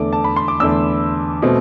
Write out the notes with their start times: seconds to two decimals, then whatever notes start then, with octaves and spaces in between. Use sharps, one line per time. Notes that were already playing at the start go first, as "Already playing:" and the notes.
Already playing: E2 D3 A3 D6
0.13 A5
0.24 B5
0.36 C6
0.48 D6
0.60 E2 D3 A3 E6
1.42 B2 A3 C4